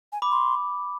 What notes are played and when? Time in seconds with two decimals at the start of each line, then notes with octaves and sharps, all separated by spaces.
0.12 G#5
0.22 B5 D6
0.31 C6